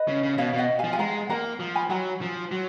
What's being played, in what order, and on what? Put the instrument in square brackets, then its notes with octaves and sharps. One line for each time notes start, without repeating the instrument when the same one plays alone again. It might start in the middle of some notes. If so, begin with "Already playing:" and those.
Already playing: [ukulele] B4 D#5
[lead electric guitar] C#3
C#3
[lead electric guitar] B2 [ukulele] C#5 F5
[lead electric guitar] B2
[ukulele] D#5 F#5
F5 G#5
[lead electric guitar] F3
[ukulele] G#5
[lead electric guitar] G#3 [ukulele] F#5 A#5
[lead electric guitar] A#3 [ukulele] F#5 A#5
[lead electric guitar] F3
[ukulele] G#5 B5
[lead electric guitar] F#3 [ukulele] F#5 A#5
[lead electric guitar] F3
F#3